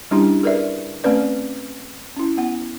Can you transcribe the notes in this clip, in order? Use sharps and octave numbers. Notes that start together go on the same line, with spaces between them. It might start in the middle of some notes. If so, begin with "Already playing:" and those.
G3 C#4 D4 E4 G4
G#4 A#4 B4 D5 E5
A3 C4 C#4 B4 D5
C#4 E4
B3 F#5